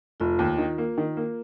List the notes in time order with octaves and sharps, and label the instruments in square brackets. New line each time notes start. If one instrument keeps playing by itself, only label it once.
[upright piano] F1 [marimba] F4
[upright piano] D#2
D#3
A#3
D#3
A#3